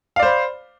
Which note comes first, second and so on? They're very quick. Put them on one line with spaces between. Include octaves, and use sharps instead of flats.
F5 D5 C5 B5